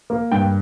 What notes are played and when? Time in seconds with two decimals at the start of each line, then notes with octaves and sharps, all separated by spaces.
0.10 A#3
0.32 G2 G5